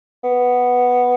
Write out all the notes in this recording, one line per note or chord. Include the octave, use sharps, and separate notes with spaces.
B3